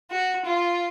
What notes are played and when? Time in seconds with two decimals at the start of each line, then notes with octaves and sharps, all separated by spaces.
0.11 F#4
0.45 F4